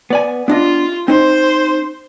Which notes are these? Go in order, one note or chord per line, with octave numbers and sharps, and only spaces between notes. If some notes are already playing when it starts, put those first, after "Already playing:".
B3 D5 G#5
B3 D4 F4 D#5
C4 D#4 C5